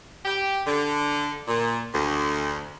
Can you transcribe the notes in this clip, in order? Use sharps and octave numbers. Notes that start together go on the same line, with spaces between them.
G4
D3
A#2
D2